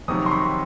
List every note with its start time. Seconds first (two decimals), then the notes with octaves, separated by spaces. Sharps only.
0.08 F2 C3 D#3 F#3 C#6 D#6
0.26 C6
0.31 B5 C#6